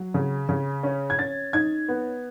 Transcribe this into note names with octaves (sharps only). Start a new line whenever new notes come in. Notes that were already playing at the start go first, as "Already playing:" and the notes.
Already playing: F#3
C#3
C#3
C#4
G#6
C#4 A6
D#4 G#6
B3